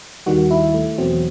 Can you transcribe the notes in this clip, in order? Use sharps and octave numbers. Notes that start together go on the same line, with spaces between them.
D#2 D#3 G3 F#4
E4
A3
E2 B2 F#3 C4